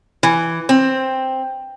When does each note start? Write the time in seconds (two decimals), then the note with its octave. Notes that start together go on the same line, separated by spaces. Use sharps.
0.23 E3
0.69 C4